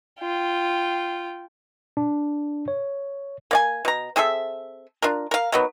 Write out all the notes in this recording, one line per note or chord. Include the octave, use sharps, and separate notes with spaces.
F4 G5
D4
C#5
A#3 D5 G#5
B2 A#5
C4 G#4 A4 E5
D4 F4 A#4
A#4 F5
D#3 F#3 B3